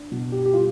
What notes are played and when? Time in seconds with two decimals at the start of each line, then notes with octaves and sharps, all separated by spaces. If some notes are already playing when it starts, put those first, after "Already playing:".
Already playing: D4
0.12 B2
0.32 G4
0.45 G4
0.53 G3 F4